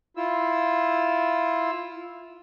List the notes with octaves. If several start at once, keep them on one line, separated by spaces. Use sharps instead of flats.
E4 F4 E6